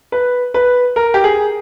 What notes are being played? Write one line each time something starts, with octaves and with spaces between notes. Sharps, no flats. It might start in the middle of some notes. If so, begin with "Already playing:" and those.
B4
B4
A#4
G4
G#4